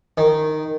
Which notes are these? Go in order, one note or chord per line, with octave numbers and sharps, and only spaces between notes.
D#3